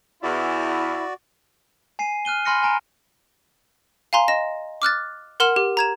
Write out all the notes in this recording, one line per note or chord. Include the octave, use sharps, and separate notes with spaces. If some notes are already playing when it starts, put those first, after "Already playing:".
E2 E4 F#4 D5
G#5 C7 D#7
F6 F#6 D#7 G7
G#5 B5 C6 F6 A#6 C#7
G#5 A#5 D7
F5 G#5 A#5 C6
D#5 A#6 E7
D6 F6 F#6 A6
A#4 F#5 C6 F6 E7 F#7
G4
A#5 G#6 E7